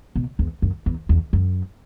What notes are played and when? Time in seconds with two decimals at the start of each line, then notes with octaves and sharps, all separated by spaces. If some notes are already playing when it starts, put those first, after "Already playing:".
0.16 B2
0.39 E2
0.62 F#2
0.86 E2
1.09 E2
1.33 F#2